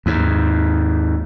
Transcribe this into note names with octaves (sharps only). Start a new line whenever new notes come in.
D#2 G#2